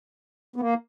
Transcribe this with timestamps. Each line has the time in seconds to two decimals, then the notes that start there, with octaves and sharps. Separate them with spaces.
0.56 B3
0.60 A#3